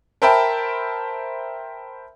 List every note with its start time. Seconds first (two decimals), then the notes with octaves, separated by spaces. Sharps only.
0.22 A#4 C5 E5 G5 A5 B5